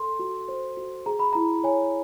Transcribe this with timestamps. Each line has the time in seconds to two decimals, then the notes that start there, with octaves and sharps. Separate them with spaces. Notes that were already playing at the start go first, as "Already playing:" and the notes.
Already playing: A4 C6
0.19 F#4
0.49 C5
0.77 F#4
1.06 G#4 A#5
1.19 B5
1.33 E4 A#5
1.64 C#5 G#5